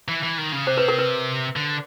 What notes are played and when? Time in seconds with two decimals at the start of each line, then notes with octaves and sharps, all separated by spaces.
0.08 E3
0.23 E3
0.38 D#3
0.52 C#3
0.67 C3 C5
0.78 B4
0.88 A#4
0.99 B4
1.56 D3